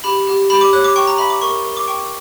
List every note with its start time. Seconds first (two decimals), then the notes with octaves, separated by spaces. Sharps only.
0.04 G4 B5
0.27 G4
0.50 G4 B5
0.61 D6
0.73 C#5 F#6
0.84 D6
0.96 G5 C#6
1.07 A#5
1.18 E5 B5
1.30 D6
1.42 A#4 C#6
1.64 A#4
1.77 D6
1.87 G5 C#6